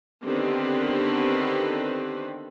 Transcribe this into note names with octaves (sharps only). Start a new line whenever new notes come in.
D3 D#3 B3 C4 G4 B4